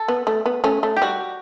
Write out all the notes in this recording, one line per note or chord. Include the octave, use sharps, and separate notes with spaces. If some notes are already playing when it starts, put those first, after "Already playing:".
Already playing: A4
B3
A3
B3
A3 C#4
A3
G4
G3 F#4